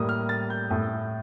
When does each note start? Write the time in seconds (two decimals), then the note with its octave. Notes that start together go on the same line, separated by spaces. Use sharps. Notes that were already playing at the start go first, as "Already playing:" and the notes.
Already playing: A2 G3 A#3 D#6
0.09 F6
0.29 A6
0.50 G6
0.70 A2 A3 D#6